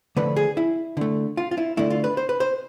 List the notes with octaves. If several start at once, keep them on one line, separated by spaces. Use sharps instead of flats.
D3 F3 A3 B4
G#4
E4
D3 A3
F4
F4
E4
D3 A3 E4
F4
B4
C5
B4
C5